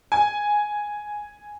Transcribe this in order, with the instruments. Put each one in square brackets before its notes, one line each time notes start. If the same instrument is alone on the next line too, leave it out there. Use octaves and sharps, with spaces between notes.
[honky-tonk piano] G#5